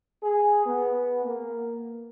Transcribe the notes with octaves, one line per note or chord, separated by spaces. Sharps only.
G#4
B3
A#3